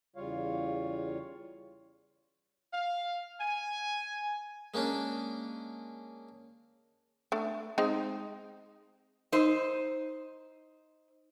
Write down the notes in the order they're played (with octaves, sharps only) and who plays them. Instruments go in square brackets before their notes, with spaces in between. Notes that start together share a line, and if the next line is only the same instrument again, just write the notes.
[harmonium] E2 C#3 G3 F4 C#5 F5
[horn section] F5
G#5
[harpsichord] G#3 A#3 C#4 D4
[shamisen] A3 D4
G#3 C4 D#4
[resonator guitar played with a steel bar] D#4 C5